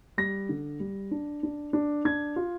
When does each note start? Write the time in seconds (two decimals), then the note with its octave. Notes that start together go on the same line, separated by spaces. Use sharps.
0.18 G3 A#6
0.49 D3
0.80 G3
1.11 D4
1.43 D4
1.73 D4
2.05 D4 G#6
2.36 F4